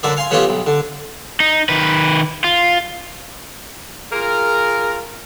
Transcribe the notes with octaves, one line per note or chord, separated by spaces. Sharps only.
F#2 D3 D5 E5
F5 G#5 C6
F#3 A3 B3 C#4 F4 G4
B1
D3
D#4
D#3 B4
F4
F4 G#4 A#4